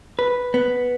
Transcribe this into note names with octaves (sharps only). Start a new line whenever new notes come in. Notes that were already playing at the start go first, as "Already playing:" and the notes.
B4
B3